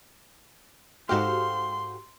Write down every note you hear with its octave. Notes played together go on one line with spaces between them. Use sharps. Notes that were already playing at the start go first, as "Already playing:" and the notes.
G#2 F#4 G4 A4 C5 F5 C6